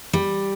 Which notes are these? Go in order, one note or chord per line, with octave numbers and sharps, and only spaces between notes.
G3